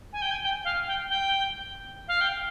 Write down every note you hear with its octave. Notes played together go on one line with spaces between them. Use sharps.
G#5
G5
G#5
G5
F5
G5
G5
F5
G5